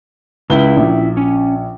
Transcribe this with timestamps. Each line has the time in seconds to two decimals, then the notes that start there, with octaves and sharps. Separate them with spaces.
0.50 C#2 C#4 E4 E5 G7
0.77 A#1
1.17 C#4